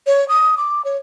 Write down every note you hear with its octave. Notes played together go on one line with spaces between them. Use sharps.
C#5
D#6
D6
C#5